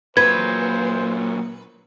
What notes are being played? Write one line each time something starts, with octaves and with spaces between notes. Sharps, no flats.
A#2 F#3 B4 C5 G#6